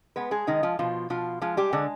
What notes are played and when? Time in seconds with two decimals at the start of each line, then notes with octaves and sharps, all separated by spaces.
0.16 G#3 B3 B4
0.31 G#3 G#4
0.47 D#3 G#3 D#4
0.63 F3 F4
0.79 B2 F3 F4
1.10 B2 F3 F4
1.41 F3 G#3 F4
1.57 G3 G4
1.73 D3 G#3 D4